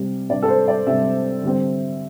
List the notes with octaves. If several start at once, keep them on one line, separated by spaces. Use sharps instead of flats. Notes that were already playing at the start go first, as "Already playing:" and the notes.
Already playing: C3 G3 C4
C3 G3 D4 D5
A4
C5
D5
C3 G3 D4 E5
D3 G3 C4